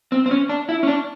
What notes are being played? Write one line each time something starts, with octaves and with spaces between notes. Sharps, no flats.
C4
C4
C#4
D4
E4
C#4
D4